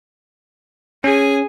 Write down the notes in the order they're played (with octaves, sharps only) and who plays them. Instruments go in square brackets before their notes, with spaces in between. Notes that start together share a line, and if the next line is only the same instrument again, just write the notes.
[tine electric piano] C#4 [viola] G#4 G#5